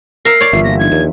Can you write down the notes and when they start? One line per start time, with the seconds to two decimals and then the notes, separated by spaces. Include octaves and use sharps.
0.25 A#4 E5 C7
0.41 C#5 D5
0.53 G1 E3 F4 E5
0.64 A#3 F#4 F5 A#6
0.79 F3 D4 D#4 G#6
0.92 D#2